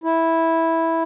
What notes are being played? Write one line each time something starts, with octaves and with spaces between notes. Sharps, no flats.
E4